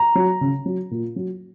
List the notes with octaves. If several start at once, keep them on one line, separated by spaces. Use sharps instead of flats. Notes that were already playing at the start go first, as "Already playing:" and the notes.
Already playing: A#5
F#3
C#3
F#3
A#2
F#3